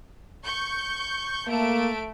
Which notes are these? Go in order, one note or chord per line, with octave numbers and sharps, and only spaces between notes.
C#6 G6
A3 A#3 D7